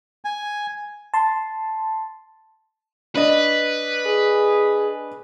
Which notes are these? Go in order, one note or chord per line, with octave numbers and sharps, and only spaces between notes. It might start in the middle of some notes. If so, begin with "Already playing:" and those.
G#5
A5 C6
D4 B4 D#5
G#4